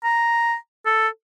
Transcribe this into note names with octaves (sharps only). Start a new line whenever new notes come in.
A#5
A4